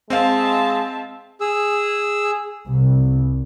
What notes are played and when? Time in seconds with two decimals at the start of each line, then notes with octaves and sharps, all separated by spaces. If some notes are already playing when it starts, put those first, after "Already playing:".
0.10 G#3 C4 E5 F5 A5
1.41 G#4 E6
2.66 C2